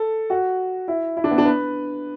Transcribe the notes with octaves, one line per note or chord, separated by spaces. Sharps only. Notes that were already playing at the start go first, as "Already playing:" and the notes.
Already playing: A4
F#4
E4
E4
D4
B3
D4
B4